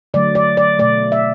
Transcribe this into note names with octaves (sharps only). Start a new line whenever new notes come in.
D3 F#3 A3 D5
D5
D5
B2 A3 D5
E5